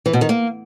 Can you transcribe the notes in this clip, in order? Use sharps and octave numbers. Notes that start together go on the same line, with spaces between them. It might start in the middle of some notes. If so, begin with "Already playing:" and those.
E3
B2
D#3
A#3